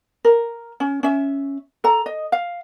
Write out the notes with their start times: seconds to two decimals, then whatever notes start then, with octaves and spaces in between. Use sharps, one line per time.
0.25 A#4
0.80 C#4
1.03 C#4 E5
1.84 A4 A#5
2.06 D#5
2.32 F5